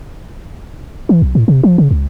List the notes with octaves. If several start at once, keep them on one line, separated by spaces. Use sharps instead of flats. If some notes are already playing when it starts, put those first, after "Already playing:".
E3
B1
A2
C3
F3
C#3
C#2